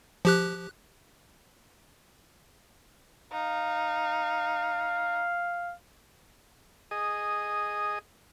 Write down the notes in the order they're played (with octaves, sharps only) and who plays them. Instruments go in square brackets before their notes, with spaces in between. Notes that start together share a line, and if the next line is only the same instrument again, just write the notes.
[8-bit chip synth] F3 G4 F#6
[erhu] D#4 [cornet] F5
[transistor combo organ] G#4 D#5